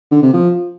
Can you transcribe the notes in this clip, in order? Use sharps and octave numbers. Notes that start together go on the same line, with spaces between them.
D3
C3
F3